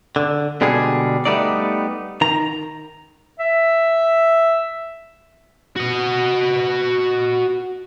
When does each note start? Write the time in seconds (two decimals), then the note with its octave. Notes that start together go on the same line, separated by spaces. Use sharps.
0.16 D3
0.61 B2 D3 G3 G#3 G#4
1.25 G3 A3 B3 D#4 D5
2.21 D#3 A#5
3.40 E5
5.76 F#4 D#5